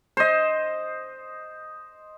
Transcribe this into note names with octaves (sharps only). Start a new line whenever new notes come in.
C5 D#5